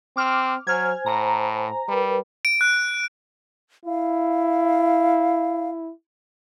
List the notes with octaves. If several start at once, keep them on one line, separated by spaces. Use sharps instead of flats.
C4 D6 F6
F#3 C5 G#5 F6 G#6
A2 A#5
G3 A#4 B4
D7
F#6
E4 F5